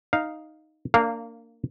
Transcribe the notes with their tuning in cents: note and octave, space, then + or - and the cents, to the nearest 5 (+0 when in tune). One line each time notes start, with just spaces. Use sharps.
D#4 +0 F5 +0
A#3 -20 D4 +0 F5 +0